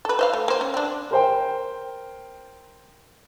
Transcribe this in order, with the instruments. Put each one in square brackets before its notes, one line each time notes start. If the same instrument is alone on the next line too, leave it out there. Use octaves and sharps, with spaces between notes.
[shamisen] A4 B4
C5 E5 F5
A3
A#3 C5
C#4
C4 D4
[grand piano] A#4 C5 G5